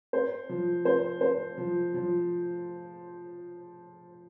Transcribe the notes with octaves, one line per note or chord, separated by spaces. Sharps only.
C5
F3
C5
C5
F3
F3